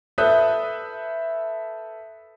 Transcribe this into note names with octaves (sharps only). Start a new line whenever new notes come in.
A4 B4 E5 D#6 F#6 G6